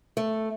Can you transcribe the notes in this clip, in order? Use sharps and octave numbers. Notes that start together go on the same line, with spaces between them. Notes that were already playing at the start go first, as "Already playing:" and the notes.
A3